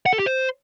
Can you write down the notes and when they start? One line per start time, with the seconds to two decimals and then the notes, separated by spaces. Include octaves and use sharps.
0.06 F#5
0.13 A4
0.19 G4
0.26 C5